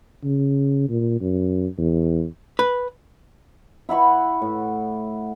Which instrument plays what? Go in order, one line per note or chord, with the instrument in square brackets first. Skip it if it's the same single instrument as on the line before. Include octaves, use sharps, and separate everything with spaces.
[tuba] C#3
A#2
F#2
E2
[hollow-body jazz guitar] B4
[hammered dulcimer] E4 F#5 B5 C#6
A2